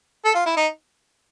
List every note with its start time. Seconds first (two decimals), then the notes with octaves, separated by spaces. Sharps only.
0.25 A4
0.34 F4
0.46 E4
0.57 D#4